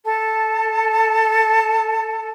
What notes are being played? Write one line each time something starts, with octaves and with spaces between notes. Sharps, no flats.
A4 A5